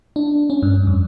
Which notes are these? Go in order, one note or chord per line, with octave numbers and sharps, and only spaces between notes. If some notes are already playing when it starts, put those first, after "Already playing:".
D4
C#4
G2
F2